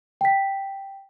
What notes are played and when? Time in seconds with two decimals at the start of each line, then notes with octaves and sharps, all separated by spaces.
0.21 G5 B6